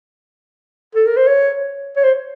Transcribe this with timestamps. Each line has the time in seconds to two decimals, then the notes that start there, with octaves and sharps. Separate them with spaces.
0.95 A4
1.06 A#4
1.17 C5
1.27 C#5
1.96 C#5
2.04 C5